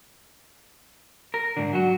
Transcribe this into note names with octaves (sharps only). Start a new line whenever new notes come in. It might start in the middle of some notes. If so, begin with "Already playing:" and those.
A#4
G#2 D3
F#3 F#4